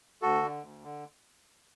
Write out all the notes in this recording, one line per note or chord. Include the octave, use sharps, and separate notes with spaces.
D2 F#4 A4
D3
D2
D3